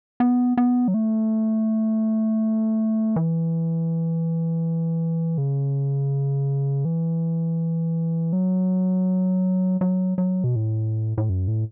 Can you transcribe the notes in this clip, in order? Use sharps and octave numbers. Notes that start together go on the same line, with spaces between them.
B3
B3
F#3
A3
E3
C#3
E3
F#3
F#3
F#3
B2
A2
A2
F#2
A2